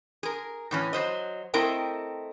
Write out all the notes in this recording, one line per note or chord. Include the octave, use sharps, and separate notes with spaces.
G#4 A#4
A2 E3 C#4
F#3 C5 D#5
A3 C4 E4 A#4 D#5 G5